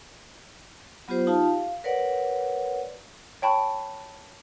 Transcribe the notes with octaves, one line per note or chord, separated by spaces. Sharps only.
F#3 B3 F4 G4 C5
D#4 F4 G4 F5 A5
F5
A#4 B4 C#5 D5 F#5
C#5 G5 A5 B5 C#6